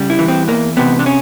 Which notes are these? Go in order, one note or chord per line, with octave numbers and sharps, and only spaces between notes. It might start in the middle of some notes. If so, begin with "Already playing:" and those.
Already playing: C#3 G3
E4
E3
C4
E2 A#3
C3 B3
D4
C#4